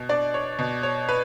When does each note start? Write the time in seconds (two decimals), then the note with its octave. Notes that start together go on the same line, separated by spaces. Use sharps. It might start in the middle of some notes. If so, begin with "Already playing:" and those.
Already playing: B2
0.09 D4 D5
0.34 C#5
0.59 B2
0.83 C#5
1.09 B4